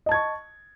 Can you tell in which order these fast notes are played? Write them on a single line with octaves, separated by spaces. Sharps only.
D#5 A5 G#6 C#6